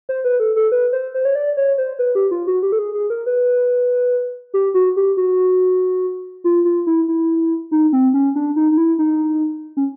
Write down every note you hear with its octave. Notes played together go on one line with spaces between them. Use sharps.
C5
B4
A4
A4
B4
C5
C5
C#5
D5
C#5
C5
B4
G4
F4
F#4
G4
A4
G#4
G#4
A#4
B4
G4
F#4
G4
F#4
F4
F4
E4
E4
D#4
C4
C#4
D4
D#4
D#4
E4
D#4
C#4